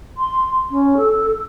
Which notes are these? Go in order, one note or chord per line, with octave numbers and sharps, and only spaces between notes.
C6
C#4
A4